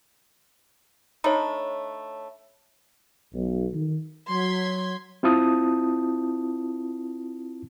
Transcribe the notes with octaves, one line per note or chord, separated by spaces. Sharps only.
A3 D4 D#4 C#5 B5
B1
D#3
F#3 C6 G#6 B6
C4 E4 F4 A5 D#6